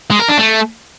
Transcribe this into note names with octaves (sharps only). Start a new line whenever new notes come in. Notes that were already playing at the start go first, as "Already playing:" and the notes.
G#3
A#4
D4
A3